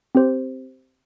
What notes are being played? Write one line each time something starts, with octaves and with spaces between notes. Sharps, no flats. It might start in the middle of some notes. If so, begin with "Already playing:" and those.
C4 G4 C5